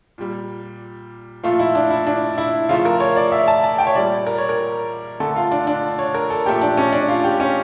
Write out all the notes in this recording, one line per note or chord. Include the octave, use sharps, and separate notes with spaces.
A#2 G3
A#2 F3 A3 F4
E4
D4
E4
D4
E4
C#3 F3 A3 F4
A#4
C#5
D5
E5
A5
A5
G5
C#5
A#2 G3 D5
A#4
C#5
A#4
D3 A3 A4
F4
D4
D4
C#5
A#4
A4
A#2 F3 A3 G4
D4
C#4
D4
F4
G4
C#4